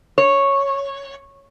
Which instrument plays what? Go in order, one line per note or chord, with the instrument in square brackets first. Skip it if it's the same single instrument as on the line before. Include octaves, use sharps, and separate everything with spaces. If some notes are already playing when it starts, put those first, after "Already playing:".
[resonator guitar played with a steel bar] C#5